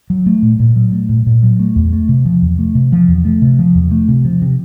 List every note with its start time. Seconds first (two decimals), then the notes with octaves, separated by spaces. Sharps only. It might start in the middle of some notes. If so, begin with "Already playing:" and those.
0.10 F#3
0.26 A3
0.42 A#2
0.60 A#2
0.76 F#3
0.92 A3
1.09 A#2
1.27 A#2
1.43 F#3
1.59 A3
1.76 E2
1.93 A3
2.09 C3
2.25 F3
2.42 E2
2.59 A3
2.75 C3
2.92 F3
3.08 E2
3.25 A3
3.42 C3
3.59 F3
3.75 E2
3.91 A3
4.08 C3
4.25 F3
4.42 C3